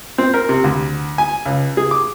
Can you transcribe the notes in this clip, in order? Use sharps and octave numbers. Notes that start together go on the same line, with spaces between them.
C4
A#4
C3
D2
G#5
C#2
G#4
D6